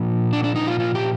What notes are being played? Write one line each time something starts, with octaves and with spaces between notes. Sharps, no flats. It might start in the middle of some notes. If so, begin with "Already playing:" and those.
Already playing: A#2 F3
D4
D4
D#4
F4
F4
G4